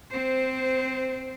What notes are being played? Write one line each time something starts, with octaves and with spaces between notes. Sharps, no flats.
C4 C5